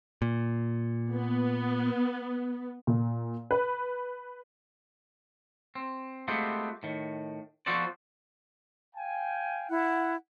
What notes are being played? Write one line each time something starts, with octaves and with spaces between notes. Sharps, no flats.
A#2
B3
A#2
B4
C4
G#3 A3 B3 C4 F4 G4
A2 D#3
F3 B3 F#4 A4 C5 D5
F5 G5 G#5
E4 F#5